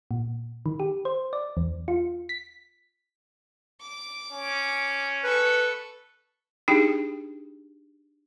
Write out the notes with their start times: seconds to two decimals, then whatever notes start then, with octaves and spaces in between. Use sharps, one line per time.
0.11 A#2
0.66 D#3
0.80 G4
1.05 C5
1.33 D5
1.57 E2
1.88 F4
2.29 B6
3.81 D6
4.32 C#4
5.24 A4 B4 C#6
6.68 D4 D#4 G4 G#4 G5